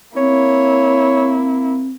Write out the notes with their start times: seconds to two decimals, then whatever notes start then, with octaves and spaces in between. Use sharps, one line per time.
0.17 A#3 C4 E4 C#5